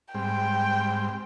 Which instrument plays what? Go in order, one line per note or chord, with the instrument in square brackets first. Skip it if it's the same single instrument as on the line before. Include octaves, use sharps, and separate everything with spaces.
[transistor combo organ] G#2 G3 C4 [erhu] G5